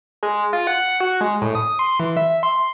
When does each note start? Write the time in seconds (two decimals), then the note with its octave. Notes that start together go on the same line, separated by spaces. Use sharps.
0.23 G#3
0.53 F4
0.67 F#5
1.00 F#4
1.21 G#3
1.42 A2
1.55 D#6
1.79 C6
2.00 E3
2.17 E5
2.43 C6